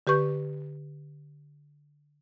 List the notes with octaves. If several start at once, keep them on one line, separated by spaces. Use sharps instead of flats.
D3 G4 B4 C#6 G6